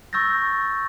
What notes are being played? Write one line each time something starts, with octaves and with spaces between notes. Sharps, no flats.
C#6 E6 G6 A6 A#6